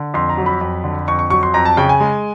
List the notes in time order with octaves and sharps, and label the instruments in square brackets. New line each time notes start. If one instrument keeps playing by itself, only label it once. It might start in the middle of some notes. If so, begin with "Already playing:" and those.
Already playing: [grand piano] D3
F2 C6
A#5
F#3
B5
F2
D3
F2 C#6
C#6
F#3 C#6
C6
F2 A#5
A5
C#3 G5
G#5
G#3